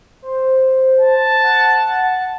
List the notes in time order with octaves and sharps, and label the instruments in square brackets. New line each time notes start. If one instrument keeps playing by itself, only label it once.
[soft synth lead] C5
[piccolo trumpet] A5
[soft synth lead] F#5